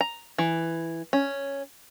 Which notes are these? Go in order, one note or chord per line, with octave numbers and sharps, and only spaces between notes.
A#5
E3
C#4